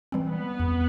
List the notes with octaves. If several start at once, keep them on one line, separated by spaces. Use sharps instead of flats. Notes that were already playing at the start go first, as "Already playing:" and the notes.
E3 G3 C4
B3
E2